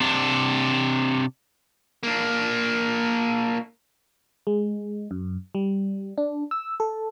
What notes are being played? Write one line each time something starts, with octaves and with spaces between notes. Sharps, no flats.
C3 D4
A#3 D4
G#3
F#2
G3
D4
E6
A4